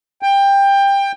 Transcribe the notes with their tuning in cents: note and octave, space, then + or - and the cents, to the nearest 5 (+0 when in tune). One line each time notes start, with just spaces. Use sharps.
G5 +20